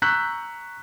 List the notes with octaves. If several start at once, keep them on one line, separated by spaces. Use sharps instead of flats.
A#5 C#6 E6 F#6 G6 B6